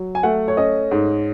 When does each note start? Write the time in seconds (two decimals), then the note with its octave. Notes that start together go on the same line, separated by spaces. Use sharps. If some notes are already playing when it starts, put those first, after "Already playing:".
Already playing: F#3
0.15 G#5
0.23 A3 F#5
0.48 C#5
0.57 C#4 D#5
0.91 G#2